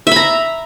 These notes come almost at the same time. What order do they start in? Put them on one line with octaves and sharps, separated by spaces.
E5 B5 A#5